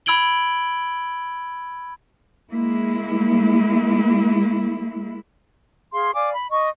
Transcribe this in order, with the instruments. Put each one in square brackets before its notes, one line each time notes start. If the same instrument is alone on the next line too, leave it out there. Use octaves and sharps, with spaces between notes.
[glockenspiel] B5 E6 G#6 D7 F#7 G7
[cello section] G#3 A#3 E4
[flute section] G#4 F5 C6
D5 F5 G#5 D6
B5
D#5 C#6